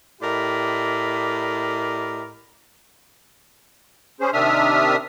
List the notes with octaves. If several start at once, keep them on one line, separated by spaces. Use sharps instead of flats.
A2 G4 A#4 D5 D#5 B5
C#4 G#4 C5
C3 D#3 D4 E5 D#6 F6